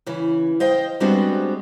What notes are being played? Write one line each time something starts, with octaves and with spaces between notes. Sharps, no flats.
C#3 E3
C5 D#5 F5 G5
G3 G#3 B3 C4 D4 F#4